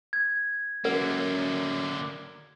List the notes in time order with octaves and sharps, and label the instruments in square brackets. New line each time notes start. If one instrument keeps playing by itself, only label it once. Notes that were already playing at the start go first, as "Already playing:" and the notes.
[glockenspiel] G#6
[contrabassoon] F#2 [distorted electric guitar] D3 A#3 [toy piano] A#4 B4 F#5